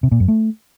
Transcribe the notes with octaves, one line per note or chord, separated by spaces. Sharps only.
C3
A#2
F#2
A3